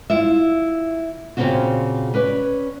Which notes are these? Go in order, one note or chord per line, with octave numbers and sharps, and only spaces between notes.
E4 F4 E5
A#2 C#3 C4 C#4 F4 F#4
C#4 B4 D5